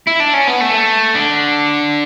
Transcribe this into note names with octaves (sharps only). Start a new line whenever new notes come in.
E4
D4
C#4
B3
A3
D3